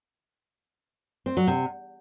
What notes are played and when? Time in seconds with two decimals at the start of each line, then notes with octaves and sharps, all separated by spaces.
1.26 C4
1.37 F#3
1.47 C3